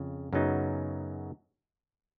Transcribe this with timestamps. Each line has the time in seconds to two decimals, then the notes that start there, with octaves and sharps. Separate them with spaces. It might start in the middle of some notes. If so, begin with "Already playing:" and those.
Already playing: F2 C#3
0.33 F#2 C#3 F#3 B3 D#4